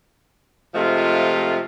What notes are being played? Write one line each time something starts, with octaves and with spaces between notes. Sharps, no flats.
C3 F3 G#3 A3 F4